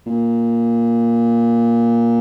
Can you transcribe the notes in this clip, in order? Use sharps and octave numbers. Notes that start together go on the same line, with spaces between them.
A#2